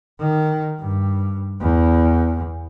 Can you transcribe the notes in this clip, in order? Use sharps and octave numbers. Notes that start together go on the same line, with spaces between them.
D#3
G2
E2